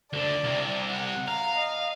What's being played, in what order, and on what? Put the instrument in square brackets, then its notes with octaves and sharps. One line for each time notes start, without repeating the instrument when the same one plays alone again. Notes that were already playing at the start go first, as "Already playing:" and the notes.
[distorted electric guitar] D2 D3 [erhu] D5
[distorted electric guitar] C2 C3
[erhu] F#5
[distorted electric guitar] F5 [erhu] A#5
[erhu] D#5